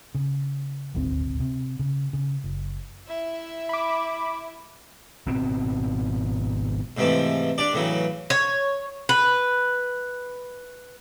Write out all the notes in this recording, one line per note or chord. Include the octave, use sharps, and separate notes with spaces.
C#3
D#1 G#1 D2 C4
C3
C#3
C#3
F#1
E4 E5
B5 D6
G#1 B2 C4
G#2 C3 E3 F3 A3
D4 G4 D5
A2 C#3 E3 F#3
C#5
B4